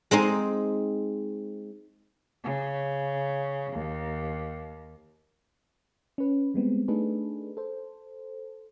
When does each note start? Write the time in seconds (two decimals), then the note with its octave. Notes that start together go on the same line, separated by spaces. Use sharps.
0.11 G#3 C4 D#4 G#4
2.44 C#3
3.73 D#2
6.18 C#4 B4
6.54 G3 G#3 B3 C4
6.88 A3 D4 D#4 G#4 A4 B4
7.57 A4 C5